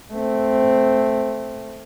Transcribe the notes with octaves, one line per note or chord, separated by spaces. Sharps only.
A3 C4